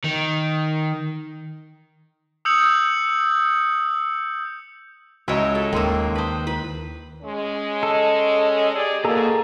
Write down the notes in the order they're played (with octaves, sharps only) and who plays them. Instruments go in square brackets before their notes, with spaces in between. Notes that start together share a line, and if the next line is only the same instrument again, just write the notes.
[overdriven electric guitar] D#3
[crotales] D#6 E6 G6 C#7 F#7
[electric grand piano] C#2 D#5 A#5 [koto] E4 C#5 [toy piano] F#4 E5 G#5
[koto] A4
[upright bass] D#2 [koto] D#3 A#3 [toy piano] G5 C6 E6
[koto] B4 C5 [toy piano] A5 D#6
[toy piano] E4 [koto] B4
[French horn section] G#3 C#4
[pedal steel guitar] A4 [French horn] D#5
[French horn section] G4 G#4 D5
[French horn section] G#2 B2 [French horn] A#3 [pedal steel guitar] G#4 A4 A#5